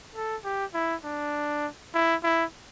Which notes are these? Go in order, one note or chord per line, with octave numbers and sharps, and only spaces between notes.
A4
G4
E4
D4
E4
E4